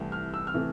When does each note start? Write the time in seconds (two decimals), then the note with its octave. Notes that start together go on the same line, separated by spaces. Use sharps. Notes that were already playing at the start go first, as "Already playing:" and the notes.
Already playing: C2 C3 E3 A3
0.12 F6
0.34 E6
0.47 F6
0.54 C3 E3 A3